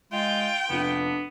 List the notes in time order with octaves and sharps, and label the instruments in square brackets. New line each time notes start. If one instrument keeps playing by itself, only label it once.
[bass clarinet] G#3 [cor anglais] F4 [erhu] G5
[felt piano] F1 F4 [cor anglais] B3 [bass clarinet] D4